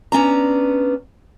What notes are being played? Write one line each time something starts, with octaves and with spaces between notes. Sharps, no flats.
B3 C#4 D4 A#5